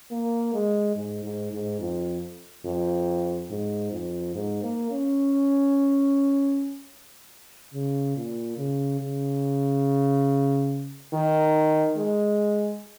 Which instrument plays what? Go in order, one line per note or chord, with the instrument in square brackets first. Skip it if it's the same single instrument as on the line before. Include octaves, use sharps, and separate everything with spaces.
[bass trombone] A#3
G#3
G#2
G#2
G#2
F2
F2
G#2
F2
G#2
A#3
C#4
C#3
A#2
C#3
C#3
D#3
G#3